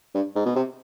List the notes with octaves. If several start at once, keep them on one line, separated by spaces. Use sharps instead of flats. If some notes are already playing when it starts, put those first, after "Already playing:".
G2
G#2
B2
C3